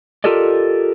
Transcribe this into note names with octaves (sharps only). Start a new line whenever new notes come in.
F4 G4 A4 A#4 D5 D#5